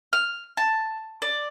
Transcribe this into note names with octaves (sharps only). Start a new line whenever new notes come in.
F6
A5
D5